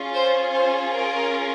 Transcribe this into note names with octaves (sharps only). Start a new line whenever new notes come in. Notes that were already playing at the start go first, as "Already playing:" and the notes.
Already playing: C#4 F4 G#4
C5
C5
A#4